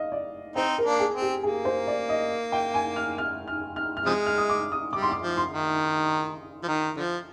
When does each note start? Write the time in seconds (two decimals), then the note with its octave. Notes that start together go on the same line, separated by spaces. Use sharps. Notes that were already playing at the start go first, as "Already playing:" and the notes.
Already playing: D#5 F5
0.12 D5
0.56 C4 D#4 C5
0.78 A#4
0.85 A#3 D4
1.00 G#4
1.14 C4
1.22 G4
1.43 A#3 G#4
1.65 C5
1.87 D5
2.09 D#5
2.52 G5
2.74 G#5
2.96 F6
3.18 F6
3.48 F6
3.76 F6
3.97 F6
4.06 C3 F3 G#3 D#6
4.26 F6
4.38 D#6
4.50 D6
4.72 D#6
4.93 G3 D6
5.02 C6
5.11 D6
5.22 F3
5.37 C6
5.52 D#3
6.64 F3
6.68 D#3
6.97 D3 F3